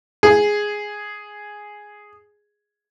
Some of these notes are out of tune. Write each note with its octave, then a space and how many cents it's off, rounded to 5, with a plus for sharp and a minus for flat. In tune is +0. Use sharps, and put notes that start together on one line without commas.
G#4 +0